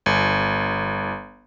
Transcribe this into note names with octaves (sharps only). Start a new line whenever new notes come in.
G1